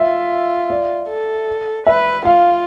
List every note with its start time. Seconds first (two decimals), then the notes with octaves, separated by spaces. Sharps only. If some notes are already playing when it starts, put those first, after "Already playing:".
Already playing: F4 E5
0.70 D5
1.09 A4
1.86 B4 E5
2.25 F4 F5